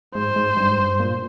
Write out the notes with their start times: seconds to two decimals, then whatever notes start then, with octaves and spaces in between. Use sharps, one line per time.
0.14 G#2 C5
0.36 G#2
0.57 G2
0.69 G#2
0.78 G2
1.00 A#2